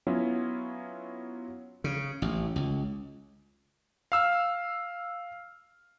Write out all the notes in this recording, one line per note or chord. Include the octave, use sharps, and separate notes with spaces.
F#3 B3 C#4 E4 F4
C#3
A1
C#2
F5 E6 F6